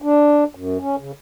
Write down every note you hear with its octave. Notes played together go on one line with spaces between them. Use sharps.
D4
F#2
C#4
C#3